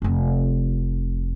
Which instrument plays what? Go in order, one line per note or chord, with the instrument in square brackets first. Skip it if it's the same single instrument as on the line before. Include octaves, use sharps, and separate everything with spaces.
[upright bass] F1 F4